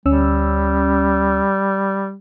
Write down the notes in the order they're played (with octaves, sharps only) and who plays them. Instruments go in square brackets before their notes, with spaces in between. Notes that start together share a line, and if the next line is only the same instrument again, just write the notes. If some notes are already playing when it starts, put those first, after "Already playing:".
[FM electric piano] D2 C#4 E6 [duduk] G3